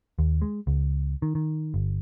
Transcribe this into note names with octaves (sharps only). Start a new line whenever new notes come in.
D#2
G#3
C#2
D#3
D#3
G1